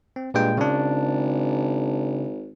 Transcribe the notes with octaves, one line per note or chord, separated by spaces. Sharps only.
C4
G2 A#2 G#3 G5
G#1 C#3 D4